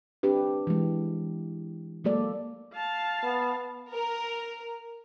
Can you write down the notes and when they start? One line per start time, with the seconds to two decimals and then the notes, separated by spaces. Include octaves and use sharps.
0.23 C4 D4 G4 B4
0.67 E3 G#3
2.04 F#3 G#3 A#3 A4 D5
2.75 F5 A5
3.23 B3
3.92 A#4